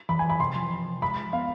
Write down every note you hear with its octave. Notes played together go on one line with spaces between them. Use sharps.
E3 B5
G#5
E3 B5
C3 C6
F3
C3
F3
G#3 B5
F3
B3 F5